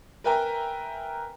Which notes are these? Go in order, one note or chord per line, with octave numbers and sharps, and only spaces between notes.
A#4 B4 E5 G5 G#5 A#5